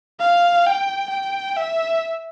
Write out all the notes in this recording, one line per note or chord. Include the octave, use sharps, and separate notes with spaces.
F5
G5
G5
E5